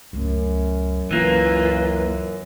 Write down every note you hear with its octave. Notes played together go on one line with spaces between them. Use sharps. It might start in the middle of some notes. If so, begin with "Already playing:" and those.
C#2 F#2 A3
C#2 E3 A#3 F4 B4